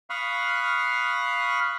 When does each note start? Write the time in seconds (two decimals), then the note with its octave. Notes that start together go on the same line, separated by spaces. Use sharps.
0.10 F5 B5 C#6 D#6 F6 F#6